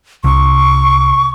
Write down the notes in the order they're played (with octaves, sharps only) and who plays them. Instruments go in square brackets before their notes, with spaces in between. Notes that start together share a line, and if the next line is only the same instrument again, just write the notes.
[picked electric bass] C2 [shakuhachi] C#6